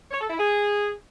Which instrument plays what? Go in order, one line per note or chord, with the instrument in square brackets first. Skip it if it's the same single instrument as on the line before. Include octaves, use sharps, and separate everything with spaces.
[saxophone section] C#5
A4
E4
G#4